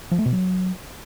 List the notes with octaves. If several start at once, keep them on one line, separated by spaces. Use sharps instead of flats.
F3
A3
B2
F#3